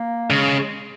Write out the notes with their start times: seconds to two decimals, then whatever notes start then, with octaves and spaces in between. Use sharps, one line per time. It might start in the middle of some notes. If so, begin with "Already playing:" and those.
Already playing: A#3
0.30 C#3 G#3